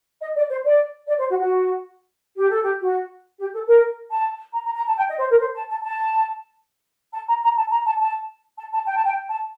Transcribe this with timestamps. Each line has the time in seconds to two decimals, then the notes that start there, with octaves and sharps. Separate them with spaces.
0.21 D#5
0.35 D5
0.50 C5
0.65 D5
1.07 D5
1.19 C5
1.29 F#4
1.40 F#4
2.37 G4
2.50 A4
2.63 G4
2.81 F#4
3.39 G4
3.53 A4
3.67 A#4
4.11 A5
4.53 A#5
4.65 A#5
4.75 A#5
4.87 A5
4.96 G5
5.08 D#5
5.19 C5
5.30 A#4
5.40 C5
5.55 A5
5.69 A5
5.84 A5
7.13 A5
7.28 A#5
7.42 A#5
7.57 A5
7.71 A#5
7.85 A5
8.00 A5
8.57 A5
8.73 A5
8.86 G5
8.95 A5
9.04 G5
9.29 A5